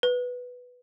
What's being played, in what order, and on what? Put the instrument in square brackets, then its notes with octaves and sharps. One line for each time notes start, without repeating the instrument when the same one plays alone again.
[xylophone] B4